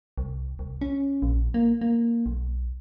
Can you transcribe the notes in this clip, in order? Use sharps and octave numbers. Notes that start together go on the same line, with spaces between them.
C2
C2
C#4
A#1
A#3
A#3
B1